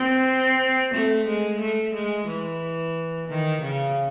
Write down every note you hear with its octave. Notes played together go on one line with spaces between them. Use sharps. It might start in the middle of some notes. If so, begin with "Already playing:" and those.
Already playing: C4
A3
G#3
A3
G#3
E3
D#3
C#3